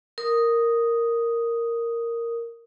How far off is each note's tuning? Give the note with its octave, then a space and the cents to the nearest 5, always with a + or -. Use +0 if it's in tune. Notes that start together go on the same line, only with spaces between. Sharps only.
A#4 -5 D#6 +0